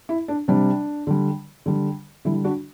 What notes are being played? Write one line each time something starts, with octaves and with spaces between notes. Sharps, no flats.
E4
D4
C3 G3 D4
D3 G3
D3 G3
D3 G3 E4
D4 F#4